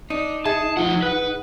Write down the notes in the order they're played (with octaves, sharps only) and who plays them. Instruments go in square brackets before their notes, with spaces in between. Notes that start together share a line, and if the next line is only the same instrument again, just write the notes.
[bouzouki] D4 [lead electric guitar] D#4
[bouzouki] G#4 G#5 [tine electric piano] E5 G#6 [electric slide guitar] A5
[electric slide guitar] F3 F#5 [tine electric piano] F4
[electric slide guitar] B4 [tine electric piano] F#5 F#6